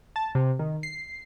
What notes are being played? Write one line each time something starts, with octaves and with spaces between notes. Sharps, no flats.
A5
C3
D#3
C7